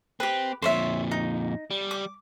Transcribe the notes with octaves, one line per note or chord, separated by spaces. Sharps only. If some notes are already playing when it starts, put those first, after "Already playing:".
C4 G4 B4
F2 A#2 C5 C#5 E5
D#4
G3
D6